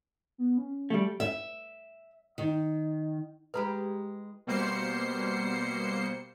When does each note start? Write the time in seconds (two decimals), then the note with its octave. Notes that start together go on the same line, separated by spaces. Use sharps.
0.38 B3
0.58 C#4
0.90 G3 A3
1.20 E5
2.38 D#3
3.54 G#3 E4 G4 B4 A#5 B5
4.47 B2 G3 A#3 C5 C7 C#7